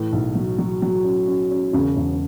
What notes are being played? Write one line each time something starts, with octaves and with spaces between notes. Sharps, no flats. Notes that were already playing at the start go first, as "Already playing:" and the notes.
Already playing: A2 E3
B1
F#3
F#3
F#3
C#4
C#4
C#4
E1 C#3
E1